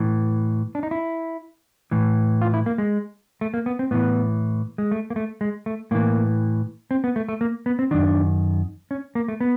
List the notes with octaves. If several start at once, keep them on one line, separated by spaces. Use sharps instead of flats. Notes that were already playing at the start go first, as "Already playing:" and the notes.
Already playing: A2 E3
D4
D#4
E4
A2 E3
F4
E4
A#3
G#3
A3
A#3
B3
C4
A2 E3 B3
G#3
A3
A#3
A3
G#3
A3
A2 E3 A#3
C4
B3
A3
A3
A#3
B3
C4
F#2 D#3 D4
C#4
A#3
A3
B3